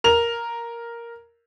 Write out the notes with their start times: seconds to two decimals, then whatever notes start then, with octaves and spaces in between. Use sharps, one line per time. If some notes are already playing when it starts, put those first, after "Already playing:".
0.04 A#4 F7